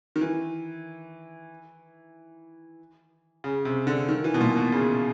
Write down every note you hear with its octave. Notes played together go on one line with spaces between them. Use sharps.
D#3
E3
C#3
C3
D3
D#3
E3
B2
A#2
B2
C#3